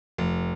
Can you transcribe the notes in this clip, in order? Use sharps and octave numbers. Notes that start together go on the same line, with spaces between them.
F1